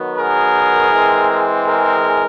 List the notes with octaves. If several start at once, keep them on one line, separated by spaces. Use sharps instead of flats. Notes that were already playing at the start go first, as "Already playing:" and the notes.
Already playing: D#3 F#3 B3
G#4 A#4
E3 G#3 C4
G#4 A#4